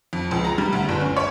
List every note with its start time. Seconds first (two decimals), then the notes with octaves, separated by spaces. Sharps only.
0.13 F2
0.31 C#2
0.45 A#5
0.58 G3
0.73 D2
0.89 G1
1.01 C#4
1.17 C#5